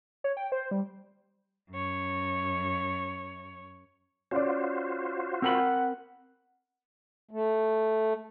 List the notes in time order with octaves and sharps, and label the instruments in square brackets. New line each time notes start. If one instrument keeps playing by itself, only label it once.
[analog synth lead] C#5
G5
C5
G3
[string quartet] F#2 C#5
[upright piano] C#4 D5 [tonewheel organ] F4 F#4 C5
[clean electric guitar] C4 A#4 B5 [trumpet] F#5 [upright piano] E6 F#7
[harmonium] A3